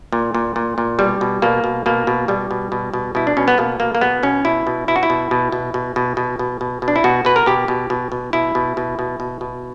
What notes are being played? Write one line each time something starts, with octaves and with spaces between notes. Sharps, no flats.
A#2
A#2
A#2
A#2
B2 G3
B2
B2 A#3
B2
B2 A#3
B2
B2 G3
B2
B2
B2
B2 E4
D4
B2 C#4
B3
B2 A#3
B2 A#3
A#3
B2 B3
B2 C#4
B2 E4
B2
B2 E4
F#4
E4
B2
B2
B2
B2
B2
B2
B2
B2
B2
D4
E4
B2 F#4
B2 B4
A#4
B2 G4
B2
B2
B2
B2 E4
B2
B2
B2
B2
B2